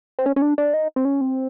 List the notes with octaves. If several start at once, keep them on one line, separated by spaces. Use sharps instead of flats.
C4
C#4
C#4
D4
D4
D#4
C4
C#4
C4